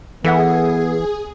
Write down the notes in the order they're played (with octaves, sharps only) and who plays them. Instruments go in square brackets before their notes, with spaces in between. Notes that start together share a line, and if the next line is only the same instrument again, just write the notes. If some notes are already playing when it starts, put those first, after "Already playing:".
[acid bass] E3 [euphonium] B3 [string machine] G#4 [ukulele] A4 E5 F#5